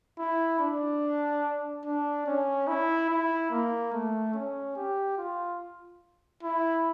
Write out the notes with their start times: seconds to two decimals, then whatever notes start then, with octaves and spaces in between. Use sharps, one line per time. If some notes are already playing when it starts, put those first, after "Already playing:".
0.19 E4
0.60 D4
1.85 D4
2.27 C#4
2.68 E4
3.09 E4
3.51 A#3
3.93 A3
4.34 C#4
4.77 G4
5.18 F4
6.43 E4